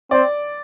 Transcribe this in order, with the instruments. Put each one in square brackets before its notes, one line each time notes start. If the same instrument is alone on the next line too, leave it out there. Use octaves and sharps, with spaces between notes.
[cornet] C4 [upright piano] D5